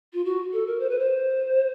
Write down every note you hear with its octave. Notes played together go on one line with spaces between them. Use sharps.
F4
F#4
A4
A#4
C5
B4
C5